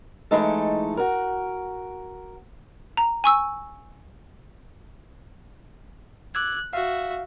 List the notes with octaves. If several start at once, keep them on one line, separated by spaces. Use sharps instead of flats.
E3 G#3 A3 D#4 A4
F#4 A#4
A#5
G#5 C#6 E6
D6 E6 F#6 G#6
F#4 E5 F5